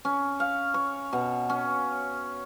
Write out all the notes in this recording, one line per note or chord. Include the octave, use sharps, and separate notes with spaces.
C#4
F5
C#5
B2
C#4